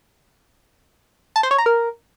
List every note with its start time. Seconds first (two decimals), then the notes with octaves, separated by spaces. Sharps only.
1.36 A5
1.43 C5
1.51 C#5
1.58 A#5
1.66 A#4